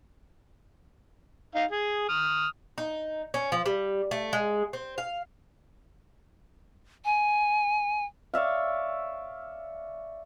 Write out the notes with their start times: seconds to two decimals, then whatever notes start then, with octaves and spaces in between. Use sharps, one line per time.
1.55 D#4 F5
1.71 G#4
2.09 D#6 F6
2.78 D#4
3.34 C#4
3.52 F3
3.66 G3
4.11 A3
4.33 G#3
4.73 C4
4.98 F5
7.05 G#5
8.34 C#5 D5 E5 F5